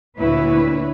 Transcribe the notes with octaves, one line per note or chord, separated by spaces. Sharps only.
D2 A#2 E4 B4 C#5